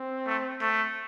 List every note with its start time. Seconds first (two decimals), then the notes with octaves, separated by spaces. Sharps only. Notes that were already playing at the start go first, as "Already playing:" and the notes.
Already playing: C4
0.27 A3
0.61 A3